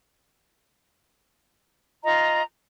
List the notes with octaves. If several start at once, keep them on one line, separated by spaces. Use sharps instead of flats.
F4 D#5 A#5